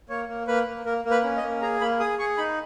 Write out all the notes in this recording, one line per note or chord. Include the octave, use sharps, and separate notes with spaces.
A#3 C#5
A#3
A#3 B4
A#3
A#3 A#4
A#3
B4
C#4
D#5
A#3
G#4 A#5
A#3 B5
G#4 D#6
G#4 C#6
D#4 B5